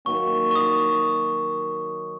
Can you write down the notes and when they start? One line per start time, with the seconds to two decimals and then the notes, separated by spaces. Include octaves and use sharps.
0.05 D#3 F#3 A#3 C#4 C#6
0.51 C#6
0.55 D#6